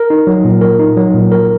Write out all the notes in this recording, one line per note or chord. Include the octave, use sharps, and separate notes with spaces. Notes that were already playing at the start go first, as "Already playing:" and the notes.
Already playing: A#4
D#4
F#3
A#2
A#4
D#4
F#3
A#2
A#4